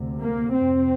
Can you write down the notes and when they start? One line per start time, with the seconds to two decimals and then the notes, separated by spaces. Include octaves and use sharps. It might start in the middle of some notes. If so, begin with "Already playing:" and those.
Already playing: D2 C3
0.19 A#3
0.53 F2 C3 C4